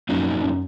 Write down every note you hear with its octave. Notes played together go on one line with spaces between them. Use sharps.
F#2 F#3 A#3 D#4
F#2